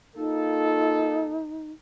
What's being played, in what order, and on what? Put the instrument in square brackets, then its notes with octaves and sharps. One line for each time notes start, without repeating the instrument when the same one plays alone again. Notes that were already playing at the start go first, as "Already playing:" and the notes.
[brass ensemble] A#3 F4 A4 [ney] D#4